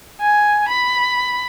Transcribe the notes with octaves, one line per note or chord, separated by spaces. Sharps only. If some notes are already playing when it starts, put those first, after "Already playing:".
G#5
B5